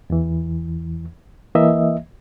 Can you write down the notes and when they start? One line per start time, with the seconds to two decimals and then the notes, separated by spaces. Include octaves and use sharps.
0.10 E2 E3
1.55 E3 A#3 D#5 E5